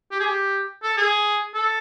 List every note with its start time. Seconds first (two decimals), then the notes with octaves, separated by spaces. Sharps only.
0.12 G4
0.20 G#4
0.27 G4
0.83 A4
0.97 G#4
1.54 A4